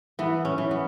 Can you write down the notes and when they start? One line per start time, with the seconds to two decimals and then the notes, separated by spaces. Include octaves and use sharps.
0.19 E3 B3
0.45 C#4
0.58 E3
0.71 B3